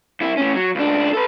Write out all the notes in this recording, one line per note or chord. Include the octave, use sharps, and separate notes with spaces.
C2 E4
A2 C#4
F#3
C#2 D4
A4 B4